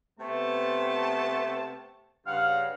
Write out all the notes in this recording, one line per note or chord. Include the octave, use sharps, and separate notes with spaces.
C3 A3 B3 A5
G2 C#3 F5 F#5